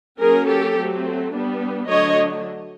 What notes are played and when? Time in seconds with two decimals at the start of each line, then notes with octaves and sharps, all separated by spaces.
0.20 F#3 A#3 C#4 G#4 A#4
0.47 G4 A4
0.77 F#3 A3 C4
1.33 G3 B3 D4
1.89 D3 F#3 A3 D4 C#5 D#5